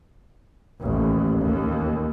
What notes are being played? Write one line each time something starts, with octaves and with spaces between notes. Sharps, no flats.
A1 D#2
D#2